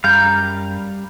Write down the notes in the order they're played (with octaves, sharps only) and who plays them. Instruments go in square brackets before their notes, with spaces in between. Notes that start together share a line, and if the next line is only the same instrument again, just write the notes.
[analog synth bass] F#2 [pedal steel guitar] G3 F5 [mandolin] A#5 G6